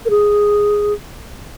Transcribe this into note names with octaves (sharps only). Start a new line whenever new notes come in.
A#4
G#4